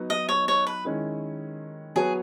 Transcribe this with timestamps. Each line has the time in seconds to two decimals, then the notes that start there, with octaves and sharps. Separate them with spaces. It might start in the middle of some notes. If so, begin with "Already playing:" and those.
Already playing: F#3 B3 D#4
0.10 D#5
0.29 C#5
0.48 C#5
0.67 B4
0.85 D#3 G#3 C#4 E4
1.95 F#3 B3 F#4 G#4 C#5